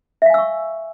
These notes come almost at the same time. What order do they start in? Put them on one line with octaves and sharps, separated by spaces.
E5 F5 G#5 E6 C#6